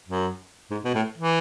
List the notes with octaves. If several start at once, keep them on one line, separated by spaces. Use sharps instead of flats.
F#2
G#2
B2
A2
E3